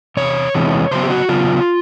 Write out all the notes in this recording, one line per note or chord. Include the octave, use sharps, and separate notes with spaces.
E2 C3 C#5
E2 C3 E3 G#3 B3
C#3 F#3 B3 C5
G4
F#4
C#3 F#3 B3 F4